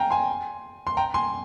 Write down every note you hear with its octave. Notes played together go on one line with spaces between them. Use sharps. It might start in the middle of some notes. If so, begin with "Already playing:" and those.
Already playing: F5 G5 G#5 A#5
G#5 C6
C6
G5 A#5
G#5 C6